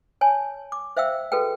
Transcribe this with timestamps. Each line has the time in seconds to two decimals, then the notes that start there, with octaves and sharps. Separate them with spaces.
0.21 C#5 G#5 A5
0.72 D6
0.97 C5 E5 F5 G5 E6
1.32 F#4 G#4 A4 B4 G5